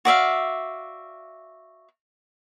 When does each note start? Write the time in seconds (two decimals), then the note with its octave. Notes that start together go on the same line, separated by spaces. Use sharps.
0.05 F#4 D5 E5 F5